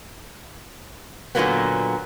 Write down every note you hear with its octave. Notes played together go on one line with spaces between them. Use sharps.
A#2 D3 F3 F#3 A#3 B3